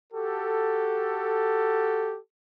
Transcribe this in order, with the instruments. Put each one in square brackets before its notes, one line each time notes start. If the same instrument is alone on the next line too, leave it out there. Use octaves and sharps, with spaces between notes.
[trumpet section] F#4 G4 A4